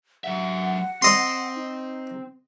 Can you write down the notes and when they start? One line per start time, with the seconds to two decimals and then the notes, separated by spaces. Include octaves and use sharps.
0.24 F#3 E5 F#5
1.02 C4 D#5 C6
1.56 D#4